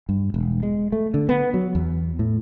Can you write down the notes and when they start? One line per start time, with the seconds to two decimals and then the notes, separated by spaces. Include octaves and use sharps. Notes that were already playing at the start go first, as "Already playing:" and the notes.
0.09 G2
0.34 E1
0.63 G#3
0.92 A3
1.14 D3
1.29 B3
1.54 F#3
1.75 E2
2.19 A2